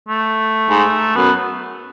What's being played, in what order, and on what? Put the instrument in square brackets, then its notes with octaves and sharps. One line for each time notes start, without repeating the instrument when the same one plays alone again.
[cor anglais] A3
[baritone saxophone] G#2
[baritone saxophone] F#2 [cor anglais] B3